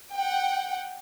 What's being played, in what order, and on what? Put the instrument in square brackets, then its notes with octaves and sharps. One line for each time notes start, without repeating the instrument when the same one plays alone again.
[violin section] F#5 G5